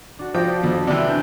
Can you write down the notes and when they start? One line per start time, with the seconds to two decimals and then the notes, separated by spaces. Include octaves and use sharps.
0.19 D4 F#4
0.35 F3 G5 D6 A#6
0.63 F2
0.87 C3 E3 D4 B5
1.08 G#5 G6 G#6